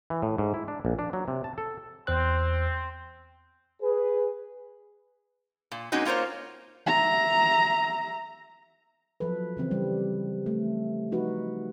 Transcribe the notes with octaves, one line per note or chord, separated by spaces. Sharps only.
E3
A2
G#2
E4
D4
A#1
D4
F#3
C3
A5
A4
E2 C4 C5 F#6
G#4 B4
A#2
G#3 A#3 C4 C#4 D#4 F#4
A#3 F4 A#4 C5 C#5
E5 A#5
F3 F#3 A4 B4
C#3 E3 C4
G3
A3
F3 D#4 F#4 B4